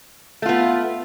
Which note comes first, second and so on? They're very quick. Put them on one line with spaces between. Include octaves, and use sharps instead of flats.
A3 F4 B3